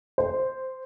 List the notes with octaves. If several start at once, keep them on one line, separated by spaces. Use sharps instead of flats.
C5